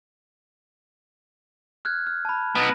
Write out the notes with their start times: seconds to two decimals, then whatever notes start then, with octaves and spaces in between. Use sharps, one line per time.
1.85 F6 F#6 G#6
2.07 F6
2.25 A5 B5
2.55 B3 D#4 F#6 A#6